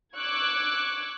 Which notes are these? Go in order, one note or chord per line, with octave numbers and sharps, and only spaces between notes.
C#6 D6 E6 F#6 G#6